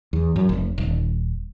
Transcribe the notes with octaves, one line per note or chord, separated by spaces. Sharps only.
E2
F#2
F1
D#1